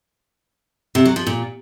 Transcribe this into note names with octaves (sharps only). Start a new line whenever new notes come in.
C3
F#3
F3
A#2